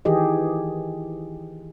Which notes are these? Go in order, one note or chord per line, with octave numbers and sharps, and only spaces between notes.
D#3 E3 G4 G#4 D#5